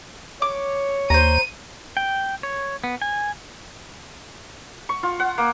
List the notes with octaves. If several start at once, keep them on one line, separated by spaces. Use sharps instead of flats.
C#5 D6
D#2 C5 A#5 D#7
G5
C#5
B3
G#5
C#6
F4
F#5
A#3